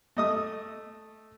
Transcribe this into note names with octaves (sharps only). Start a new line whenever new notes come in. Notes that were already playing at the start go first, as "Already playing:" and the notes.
A3 D#5 D#6